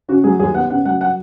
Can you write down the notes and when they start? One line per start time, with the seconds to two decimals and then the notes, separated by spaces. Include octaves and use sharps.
0.08 C#3 F#4
0.24 F#3 G#4
0.39 D#2 G#4
0.54 B3 F#5
0.70 C#3 F#5
0.85 F#3 F#5
1.01 F#5